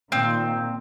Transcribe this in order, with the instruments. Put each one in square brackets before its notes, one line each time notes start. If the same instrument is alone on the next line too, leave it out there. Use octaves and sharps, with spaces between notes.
[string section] A#2 D#3 [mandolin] C4